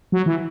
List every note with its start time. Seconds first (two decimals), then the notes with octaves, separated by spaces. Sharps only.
0.12 F#3
0.26 E3